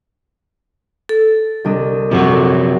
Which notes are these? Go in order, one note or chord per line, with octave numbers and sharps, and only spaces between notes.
A4
C2 D4 D#5
A#1 F#2 C3 F#4